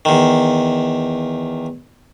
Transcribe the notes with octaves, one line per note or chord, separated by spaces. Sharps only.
E2 D#3